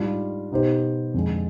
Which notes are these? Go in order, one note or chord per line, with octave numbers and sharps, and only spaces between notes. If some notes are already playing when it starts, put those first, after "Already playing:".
Already playing: G#2 G3 D4 F4
B2 B3 D#4 G4 C5
F2 D3 G#3